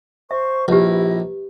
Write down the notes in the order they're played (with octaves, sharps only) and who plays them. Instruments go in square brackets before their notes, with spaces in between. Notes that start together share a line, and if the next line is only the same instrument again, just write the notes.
[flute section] C5 C#6 [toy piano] E5
[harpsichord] A#1 [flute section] E4 D#5 [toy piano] G4 B4